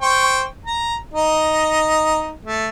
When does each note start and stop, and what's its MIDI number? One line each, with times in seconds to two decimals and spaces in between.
0.01 0.44 72
0.01 0.44 79
0.01 0.44 85
0.65 0.96 82
1.14 2.33 63
1.14 2.33 75
2.45 2.69 57